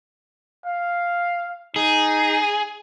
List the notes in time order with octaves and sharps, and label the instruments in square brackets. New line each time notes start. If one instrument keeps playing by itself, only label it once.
[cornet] F5
[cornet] D#4 [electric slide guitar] G#4